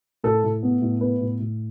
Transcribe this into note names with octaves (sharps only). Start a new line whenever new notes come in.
A2 A4
A2
B3
A2
B3 B4
A2
A2